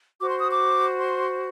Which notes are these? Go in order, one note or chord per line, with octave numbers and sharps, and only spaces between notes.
F#4 C5 D6
C6
D#6
D6
C6